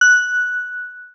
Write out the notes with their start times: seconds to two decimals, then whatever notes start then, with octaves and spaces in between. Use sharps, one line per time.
0.01 F#6